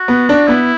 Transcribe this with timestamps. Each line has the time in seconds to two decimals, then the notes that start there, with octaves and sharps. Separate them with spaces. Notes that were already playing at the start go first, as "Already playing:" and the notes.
Already playing: F#4
0.08 B3
0.29 D4
0.48 B3 E4